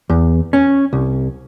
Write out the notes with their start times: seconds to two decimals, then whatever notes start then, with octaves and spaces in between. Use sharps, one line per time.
0.09 E2
0.53 C#4
0.93 C2